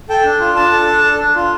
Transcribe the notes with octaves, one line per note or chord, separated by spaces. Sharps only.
A4 G5
D4
F4
D4 A5
A4
D4
A4
D4
F4